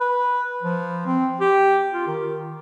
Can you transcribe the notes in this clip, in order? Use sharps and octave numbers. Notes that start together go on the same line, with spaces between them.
B4
F3
C4
G4
F4
D#3